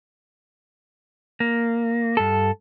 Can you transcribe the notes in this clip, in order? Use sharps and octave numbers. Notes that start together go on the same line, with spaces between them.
A#3
G2 A4